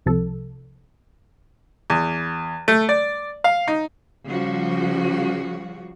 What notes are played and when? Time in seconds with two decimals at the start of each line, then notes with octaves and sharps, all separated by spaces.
0.06 C2 C3 F3 A4
1.90 E2
2.68 A3
2.89 D5
3.44 F5
3.68 D#4
4.26 C#3 F3 G3 F#4